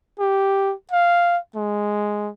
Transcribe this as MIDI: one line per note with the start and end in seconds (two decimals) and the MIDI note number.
0.20 0.74 67
0.92 1.38 77
1.56 2.30 56